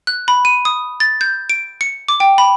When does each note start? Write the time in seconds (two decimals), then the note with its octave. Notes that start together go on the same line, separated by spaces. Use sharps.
0.07 F#6
0.28 B5
0.45 D#7
0.65 D#6
1.00 A6
1.21 G6
1.50 D7
1.81 C#7
2.08 D6
2.20 G5
2.38 B5